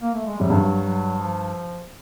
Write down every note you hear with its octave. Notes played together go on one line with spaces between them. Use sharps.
A#3
A3
G#3
F#2 G3
G2 F#3
F#3
F3